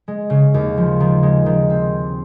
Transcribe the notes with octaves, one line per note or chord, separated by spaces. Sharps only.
G#3
C#3
D#2
F3
D#3
G#3
D#3
C4